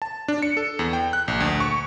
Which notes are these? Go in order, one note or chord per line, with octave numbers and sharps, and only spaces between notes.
A5
D4
C#7
A4
E2
G5
F#6
A#1
D2
C#6